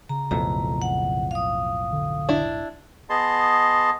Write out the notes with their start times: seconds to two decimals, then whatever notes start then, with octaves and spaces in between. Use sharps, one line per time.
0.09 C#3 A#5
0.31 B1 F2 A2 A#5
0.82 F#5
1.31 F5 D#6
1.92 D3
2.29 D4 E4
3.10 B3 G#4 D#5 A5 C6